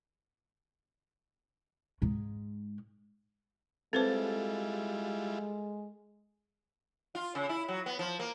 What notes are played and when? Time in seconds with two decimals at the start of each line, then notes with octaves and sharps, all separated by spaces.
2.02 G#2 G#3
3.93 G3 G#3 C4 E4 F4 A4 B4 C5
7.15 F4
7.35 C#3
7.49 E4
7.68 F#3
7.86 B3
7.99 F3
8.19 A#3